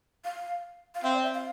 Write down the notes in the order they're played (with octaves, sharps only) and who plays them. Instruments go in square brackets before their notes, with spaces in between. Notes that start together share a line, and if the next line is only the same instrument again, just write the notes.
[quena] F5
F5
[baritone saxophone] C4 [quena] E5
[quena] D5
E5
F5